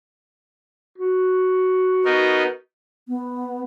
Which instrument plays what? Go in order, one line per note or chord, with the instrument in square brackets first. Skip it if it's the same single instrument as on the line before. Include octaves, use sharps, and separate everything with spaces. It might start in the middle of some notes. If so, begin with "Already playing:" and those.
[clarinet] F#4
[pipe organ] B3 D#4 A#4
[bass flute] B3